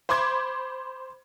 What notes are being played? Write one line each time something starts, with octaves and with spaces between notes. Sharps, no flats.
C5 B5 C6 D6 G#6